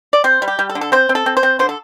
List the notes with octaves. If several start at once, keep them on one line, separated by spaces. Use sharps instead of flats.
D5
C4 C5
G3
G4
G3
A4
D3
A4
C4 C5
C4
A4
C4
C5
C4
D3 C5
A4